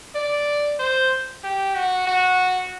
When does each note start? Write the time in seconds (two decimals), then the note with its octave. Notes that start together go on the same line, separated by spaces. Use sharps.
0.15 D5
0.79 C5
1.44 G4
1.75 F#4
2.07 F#4